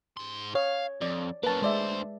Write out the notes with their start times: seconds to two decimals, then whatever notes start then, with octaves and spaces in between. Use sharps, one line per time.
0.17 G#2 C6
0.55 C#5 F5
1.02 F2 D5
1.44 A#3 C#4 B4 A5
1.62 D2 G#3 C5 D5 E5